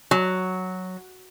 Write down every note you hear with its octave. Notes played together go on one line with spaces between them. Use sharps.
F#3